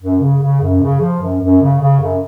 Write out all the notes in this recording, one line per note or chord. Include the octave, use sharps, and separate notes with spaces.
F#2
C#3
C#3
F#2
C#3
F3
F#2
F#2
C#3
C#3
F#2